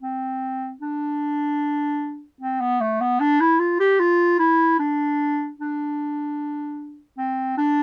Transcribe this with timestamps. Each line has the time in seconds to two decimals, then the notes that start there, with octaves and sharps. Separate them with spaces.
0.02 C4
0.81 D4
2.41 C4
2.61 B3
2.81 A3
3.01 B3
3.20 D4
3.40 E4
3.59 F4
3.80 G4
4.00 F4
4.39 E4
4.79 D4
5.59 D4
7.18 C4
7.58 D4